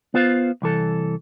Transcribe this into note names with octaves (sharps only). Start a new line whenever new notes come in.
B3 F4 C5 F5
C2 E3 A4